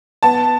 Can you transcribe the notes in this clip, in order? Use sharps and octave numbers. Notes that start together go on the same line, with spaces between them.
B3 A5